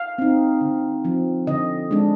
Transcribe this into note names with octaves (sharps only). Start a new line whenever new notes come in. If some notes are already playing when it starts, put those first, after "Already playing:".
Already playing: F5
C4 D#4
D3
F3 C4
D3 D#5
G#3 D4